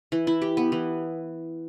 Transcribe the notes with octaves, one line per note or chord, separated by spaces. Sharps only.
E3
E4
G4
B3
E3